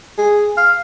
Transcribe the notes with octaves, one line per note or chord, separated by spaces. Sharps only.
G#4
F5